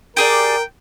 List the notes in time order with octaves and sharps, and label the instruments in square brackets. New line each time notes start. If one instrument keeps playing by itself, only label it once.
[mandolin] G4 G#4 D5 [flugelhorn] A#4 [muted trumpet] G5